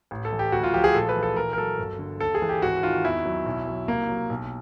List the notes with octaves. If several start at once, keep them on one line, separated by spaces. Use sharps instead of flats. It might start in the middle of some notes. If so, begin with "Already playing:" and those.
A1
A4
E3
G4
D2 F#4
F4
F3 G4
G#4
A#1 A4
B4
E3
A4
A#1 A#4
A#4
F#3 A4
G1
D3
D#2 A4
G#4
E3
G4
G#1 F#4
D#3 F4
E2 E4
F#3
B1
F#3
C2 A#3
F#3
B1